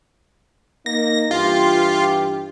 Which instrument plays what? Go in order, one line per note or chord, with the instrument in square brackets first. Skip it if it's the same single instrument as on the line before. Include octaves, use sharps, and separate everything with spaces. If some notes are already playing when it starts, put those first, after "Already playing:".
[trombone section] A#3 D#4 [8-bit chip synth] A#6
[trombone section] G2 E3 G4 [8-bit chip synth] F4